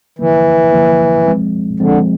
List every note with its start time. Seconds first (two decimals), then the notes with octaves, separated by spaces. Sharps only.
0.19 D3 E3 F3 A#3
0.73 D3 F3 A#3
1.26 F3 G#3 C4
1.80 D3 F3 G#3 C4